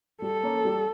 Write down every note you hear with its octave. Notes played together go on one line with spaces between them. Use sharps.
G3 A4
A#3 C#4
G3